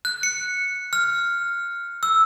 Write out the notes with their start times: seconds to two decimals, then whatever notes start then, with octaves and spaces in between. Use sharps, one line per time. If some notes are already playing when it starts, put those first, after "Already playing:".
0.05 F#6
0.23 C#7
0.93 F6
2.03 E6